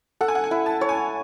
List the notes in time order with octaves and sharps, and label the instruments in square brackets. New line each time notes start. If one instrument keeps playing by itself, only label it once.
[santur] A4 [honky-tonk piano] F#5
[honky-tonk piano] G#5
F#5
G#5
[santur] E4
[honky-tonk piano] A5
[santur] C#5
[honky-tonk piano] G#5